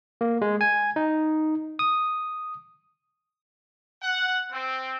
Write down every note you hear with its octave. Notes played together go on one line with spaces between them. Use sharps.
A#3
G#3
G#5
D#4
D#6
F#5
C4